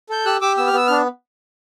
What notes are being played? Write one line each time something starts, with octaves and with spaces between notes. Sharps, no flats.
A4 G6
G4 E6 F#6
G4 D6 E6
B3 E6
F6
B3 E6
D4 F6